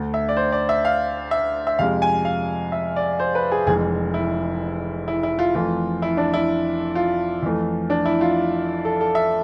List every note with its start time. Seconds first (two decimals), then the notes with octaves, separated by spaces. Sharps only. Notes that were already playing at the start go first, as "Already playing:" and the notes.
Already playing: D2 D3 A3
0.14 E5
0.29 D5
0.37 C5
0.52 D5
0.69 E5
0.85 F5
1.31 E5
1.67 E5
1.79 F2 C3 G#3 F5
2.02 G#5
2.25 F5
2.72 E5
2.96 D5
3.19 C5
3.35 B4
3.51 G#4
3.67 F1 F2 E3 G#3 G#4
4.14 E4
5.08 E4
5.23 E4
5.39 F4
5.55 F2 E3 A3 F4
6.02 E4
6.17 D4
6.33 E4
6.95 F4
7.42 F2 E3 A3
7.90 D4
8.05 E4
8.21 F4
8.85 A4
9.01 A4
9.15 E5